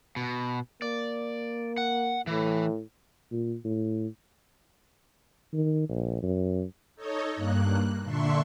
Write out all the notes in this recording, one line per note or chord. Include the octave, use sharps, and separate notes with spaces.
B2
A#3 D5
F#5
A2 E3
A#2
A2
D#3
A#1
F#2
D#4 A4 C#5 D#5
G2 A#3 F#6
A#2 D3 D4 E5 C6 C#6